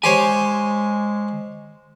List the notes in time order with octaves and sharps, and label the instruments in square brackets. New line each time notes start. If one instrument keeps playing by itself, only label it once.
[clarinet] G#3 [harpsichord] G4 C5 C#5 [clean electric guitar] G#5